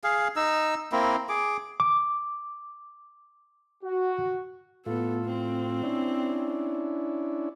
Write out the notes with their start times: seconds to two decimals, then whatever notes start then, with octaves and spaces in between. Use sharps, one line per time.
0.04 G#4 F5
0.36 D#4 E6
0.92 A#3 C4 E4
1.29 G#4 D6
1.80 D6
3.84 F#4
4.86 A2 B3 F4 A4
5.26 C4
5.83 C#4 D4 E4